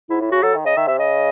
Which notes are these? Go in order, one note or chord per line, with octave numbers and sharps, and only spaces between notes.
G#2 E4
A2 E4
C#3 F#4
F#3 A4
D#3
C#3 D#5
D#3 E5
C3 E5
C#3 D#5